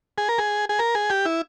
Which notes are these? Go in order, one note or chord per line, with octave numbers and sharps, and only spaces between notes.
G#4
A#4
G#4
G#4
A#4
G#4
G4
E4